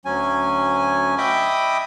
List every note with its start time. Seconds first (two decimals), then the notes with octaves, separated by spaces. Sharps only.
0.05 D2 F#3 C#4 G#5
1.18 D#5 E5 G5 B5 D6 D#6